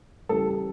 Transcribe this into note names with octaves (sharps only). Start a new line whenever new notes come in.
C#3 E3 G3 A4